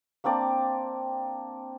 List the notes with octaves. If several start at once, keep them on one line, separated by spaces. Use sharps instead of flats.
A#3 C4 D4 D5